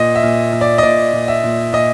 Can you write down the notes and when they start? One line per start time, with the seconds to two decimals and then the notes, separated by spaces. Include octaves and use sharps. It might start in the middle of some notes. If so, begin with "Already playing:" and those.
Already playing: A#2 D#5
0.15 E5
0.23 A#2
0.53 A#2
0.61 D5
0.78 D#5
0.83 A#2 D5
1.13 A#2
1.28 E5
1.44 A#2
1.73 A#2 D#5